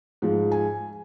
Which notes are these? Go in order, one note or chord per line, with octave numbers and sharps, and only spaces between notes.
G#2 F3
G#5